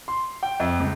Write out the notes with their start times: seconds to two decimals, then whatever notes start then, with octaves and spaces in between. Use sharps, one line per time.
0.08 C6
0.43 G5
0.60 F2
0.80 C#2